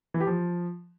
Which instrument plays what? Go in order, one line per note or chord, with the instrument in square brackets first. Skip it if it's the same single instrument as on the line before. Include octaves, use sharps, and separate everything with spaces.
[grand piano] E3
G4
F3